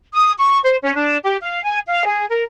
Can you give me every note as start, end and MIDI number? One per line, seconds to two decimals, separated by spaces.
0.14 0.32 87
0.38 0.58 85
0.64 0.76 72
0.83 0.95 61
0.95 1.17 62
1.23 1.37 67
1.42 1.60 77
1.63 1.78 80
1.88 2.05 77
2.06 2.25 68
2.29 2.42 70